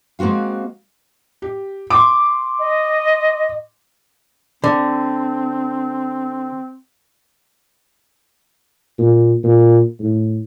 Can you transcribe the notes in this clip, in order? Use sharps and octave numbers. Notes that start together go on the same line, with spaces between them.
G#3 A#3 C4 F#4 F5
G4
C6 D6
D#5
D3 C4
A#2
A#2
A2